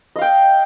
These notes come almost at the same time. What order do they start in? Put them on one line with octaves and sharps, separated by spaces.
D#5 F5 G5